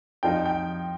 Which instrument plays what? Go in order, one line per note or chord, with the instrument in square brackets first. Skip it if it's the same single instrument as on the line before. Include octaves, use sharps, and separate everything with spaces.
[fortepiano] F2 F3 D#4 [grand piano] G5
[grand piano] G5